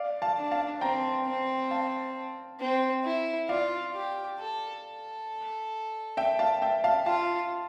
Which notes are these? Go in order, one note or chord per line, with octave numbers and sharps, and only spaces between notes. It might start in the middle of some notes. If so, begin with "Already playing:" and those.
Already playing: D5 F5
F5 A5
D4
F5 A5
C4 G5 A#5
C4
F5 A5
C4
E4
F4 D5 F5
G4
A4
A4
E5 G5
F5 A5
E5 G5
F5 A5
F4 F5 A5